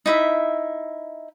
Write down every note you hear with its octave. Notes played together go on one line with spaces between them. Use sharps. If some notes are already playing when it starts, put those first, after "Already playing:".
D#4 E4 E5